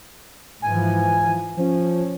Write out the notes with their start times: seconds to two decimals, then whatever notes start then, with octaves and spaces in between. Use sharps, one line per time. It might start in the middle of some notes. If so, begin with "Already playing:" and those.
0.62 G#2 E3 F3 G#5
1.57 F3 C#4